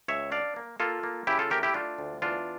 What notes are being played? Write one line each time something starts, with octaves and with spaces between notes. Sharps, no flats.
C#2 C#5 E5
D4 D5 F5
A#3
A#3 F4 A4
A#3
C#3 E4 G4
F4 A4
A3 G4 A#4
E4 G4
A3 D4 F4
D2
E2 D4 F4